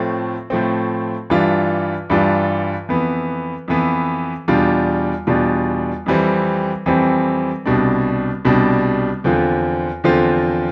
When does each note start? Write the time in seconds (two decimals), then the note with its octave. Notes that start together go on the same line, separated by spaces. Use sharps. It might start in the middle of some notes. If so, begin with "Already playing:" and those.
Already playing: A2 F3 A3 C4
0.50 A2 F3 A3 C4
1.30 G2 E3 G3 D4 F4
2.10 G2 E3 G3 D4 F4
2.89 F2 E3 B3
3.68 F2 E3 B3
4.48 E2 B2 G3 D4 F4
5.27 E2 B2 G3 D4 F4
6.06 F2 E3 G3 C4
6.86 F2 E3 G3 C4
7.66 C2 B2 G3 D4
8.45 C2 B2 G3 D4
9.24 E2 D3 F3 C4 F4
10.04 E2 D3 F3 C4 F4